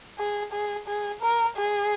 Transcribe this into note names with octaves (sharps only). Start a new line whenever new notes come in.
G#4
G#4
G#4
A#4
G#4